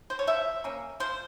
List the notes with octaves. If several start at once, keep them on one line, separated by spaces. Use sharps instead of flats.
C5
C#5
F3 E5
A#3 C#4
F3 C5